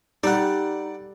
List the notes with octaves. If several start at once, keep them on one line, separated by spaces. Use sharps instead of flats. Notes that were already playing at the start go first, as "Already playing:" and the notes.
G3 D#4 A4 D5 F#5